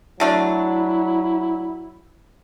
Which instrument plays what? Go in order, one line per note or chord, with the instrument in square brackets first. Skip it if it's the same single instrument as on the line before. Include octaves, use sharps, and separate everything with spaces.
[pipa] D3 A3 D4 [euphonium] F#3 [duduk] E4